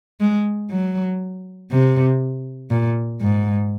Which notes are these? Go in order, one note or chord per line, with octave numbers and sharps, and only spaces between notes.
G#3
F#3
C3
A#2
G#2